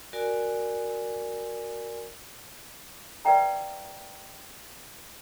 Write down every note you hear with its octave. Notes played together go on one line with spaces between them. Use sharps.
F#4 A#4 D5 G#5
B4 D5 E5 F5 G5 A#5